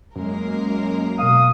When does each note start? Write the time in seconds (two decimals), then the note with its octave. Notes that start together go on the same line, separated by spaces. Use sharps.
0.16 F#2 G#3 A#3 A#4
1.19 B2 F5 D#6